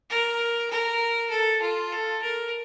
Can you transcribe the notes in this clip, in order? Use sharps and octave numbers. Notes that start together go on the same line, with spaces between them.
A#4
A#4
A4
F4
A4
A#4